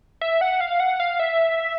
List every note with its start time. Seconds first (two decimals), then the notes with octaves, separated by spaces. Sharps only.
0.21 E5
0.41 F#5
0.61 F5
0.80 F#5
1.00 F5
1.20 E5